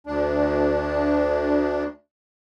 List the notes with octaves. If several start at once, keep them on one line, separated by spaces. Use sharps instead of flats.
D2 D4